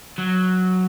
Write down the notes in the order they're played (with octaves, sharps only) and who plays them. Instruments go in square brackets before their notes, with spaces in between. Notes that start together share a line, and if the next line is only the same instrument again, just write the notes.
[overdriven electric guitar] F#3